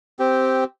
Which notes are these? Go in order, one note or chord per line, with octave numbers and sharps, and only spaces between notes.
C4 G4